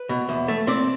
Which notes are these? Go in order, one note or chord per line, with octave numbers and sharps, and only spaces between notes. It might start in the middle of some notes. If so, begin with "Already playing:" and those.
Already playing: B4
B2
E2
A3
C4 D5